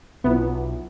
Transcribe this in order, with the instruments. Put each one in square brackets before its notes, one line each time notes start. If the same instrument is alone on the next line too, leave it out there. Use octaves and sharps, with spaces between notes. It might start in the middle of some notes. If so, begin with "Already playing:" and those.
[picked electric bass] B1 [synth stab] B3 [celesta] E4 F4 E5